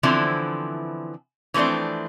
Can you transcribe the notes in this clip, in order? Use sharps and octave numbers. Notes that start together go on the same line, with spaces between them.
D3 E3 F3 B3 C4 E4
E3 F3 A3 C4 D4